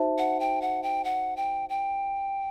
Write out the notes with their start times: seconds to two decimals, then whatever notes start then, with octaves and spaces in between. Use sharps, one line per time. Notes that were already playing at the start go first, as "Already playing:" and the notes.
Already playing: D#4 F#4 C5 E5 A5
0.18 F#5
0.40 G5
0.62 F#5
0.83 G5
1.04 F#5
1.37 G5
1.69 G5